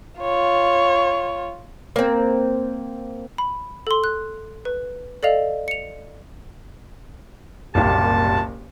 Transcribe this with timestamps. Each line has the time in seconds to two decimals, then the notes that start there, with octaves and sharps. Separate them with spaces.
0.20 F4 C#5
1.96 A#3 C4
3.38 B5
3.87 A4 C6
4.04 F#6
4.65 B4
5.23 A4 D5 D#5 F5 F7
5.68 C#7 F7
7.75 F#1 C2 A#2 G3 G4 A5